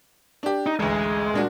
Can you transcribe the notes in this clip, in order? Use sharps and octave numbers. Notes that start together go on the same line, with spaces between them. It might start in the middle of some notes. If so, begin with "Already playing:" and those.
D4 G4
D#4
A1 D2 G#3
A#2 D4 F#4